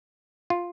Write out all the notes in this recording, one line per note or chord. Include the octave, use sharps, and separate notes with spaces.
F4